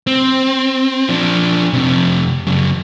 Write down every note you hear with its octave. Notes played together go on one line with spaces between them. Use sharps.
C4
F3 D4
F2 C3
F#2 C#3